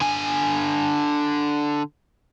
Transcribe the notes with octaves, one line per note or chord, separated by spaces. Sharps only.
D3 G#5